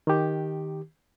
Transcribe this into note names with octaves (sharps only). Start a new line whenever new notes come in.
D#3 G4